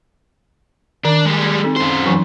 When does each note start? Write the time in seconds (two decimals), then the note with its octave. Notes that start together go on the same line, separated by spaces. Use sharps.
1.05 D#3 D4
1.25 G3 G#3
1.64 C4 D#4 A4
1.77 F#2 C5
2.06 E3 F#3 D#4